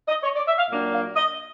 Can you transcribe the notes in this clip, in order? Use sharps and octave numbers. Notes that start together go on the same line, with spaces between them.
D#5
C#5
D5
E5
F5
A#2 F#3 A#3 D4
F5
D#5